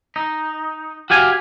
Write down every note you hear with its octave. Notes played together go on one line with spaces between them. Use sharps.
D#4
F#4 G4 F5 G#5